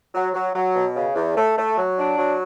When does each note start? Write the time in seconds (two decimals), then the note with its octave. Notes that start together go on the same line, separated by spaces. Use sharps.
0.14 F#3
0.34 F#3
0.55 F#3
0.75 B2
0.96 C#3
1.16 E2
1.37 A3
1.57 A3
1.78 F#3
1.98 D4
2.18 F#3